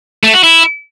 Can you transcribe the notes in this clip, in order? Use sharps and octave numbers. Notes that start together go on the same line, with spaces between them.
A3
F#4
E4